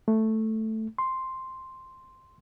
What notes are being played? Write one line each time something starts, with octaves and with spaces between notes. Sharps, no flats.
A3
C6